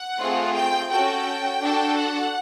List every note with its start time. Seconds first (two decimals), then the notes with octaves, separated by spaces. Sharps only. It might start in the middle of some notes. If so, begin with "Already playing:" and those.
Already playing: F#5
0.20 A3 C4 F4 G#4
0.55 G5
0.91 C#4 F#4 A4 G5
1.61 D4 F#4 A4
1.97 F#5